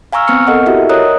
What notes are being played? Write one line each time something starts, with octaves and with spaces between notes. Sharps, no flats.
F5 G#5 A#5 C#6 E6 F6
B3 C4 C#6 F6 C#7
A4 A#4 D#5 F#5
E4 F#4 G4 A4 E5
A#4 C#5 D#5 A#5 D#6 F#6